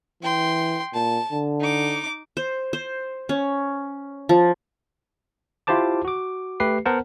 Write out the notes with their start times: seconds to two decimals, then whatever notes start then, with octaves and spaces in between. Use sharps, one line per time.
0.23 E3 G5 C6
0.94 A#2 A5
1.32 D3
1.61 D#4 D6
2.37 C5
2.73 C5
3.29 C#4
4.29 F3
5.67 E4 F4 G4 C5 A5 D6
6.05 F#4 D6
6.60 A3 G4 B4 C7
6.85 B3 A#4 C5 F#5 A5